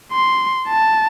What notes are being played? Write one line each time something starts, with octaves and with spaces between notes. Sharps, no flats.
C6
A5